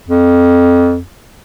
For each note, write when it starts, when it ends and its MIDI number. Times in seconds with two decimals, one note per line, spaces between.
0.08 1.00 41